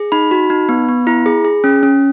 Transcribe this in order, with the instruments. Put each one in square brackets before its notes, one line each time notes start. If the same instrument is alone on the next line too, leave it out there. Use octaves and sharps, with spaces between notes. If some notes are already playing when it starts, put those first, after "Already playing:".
Already playing: [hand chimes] G#4
D#4 B5
F#4
D#4
B3
B3
E4
G#4
G#4
C#4
C#4